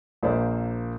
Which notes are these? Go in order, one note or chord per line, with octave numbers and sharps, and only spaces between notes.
A#1 A#3 C5 D5